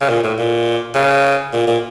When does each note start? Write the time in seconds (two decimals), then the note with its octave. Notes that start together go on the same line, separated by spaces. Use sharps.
0.01 C#3
0.10 A#2
0.23 A2
0.38 A#2
0.95 C#3
1.53 A#2
1.67 A#2